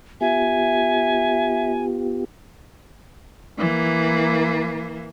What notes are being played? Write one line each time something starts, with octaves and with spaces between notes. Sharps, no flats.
B3 F4 G4 E5 G#5
E3 A#3